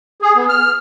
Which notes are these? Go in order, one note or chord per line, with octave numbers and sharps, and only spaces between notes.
G#4
B3
F6